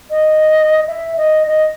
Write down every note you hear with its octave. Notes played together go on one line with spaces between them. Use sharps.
D#5
E5
D#5
D#5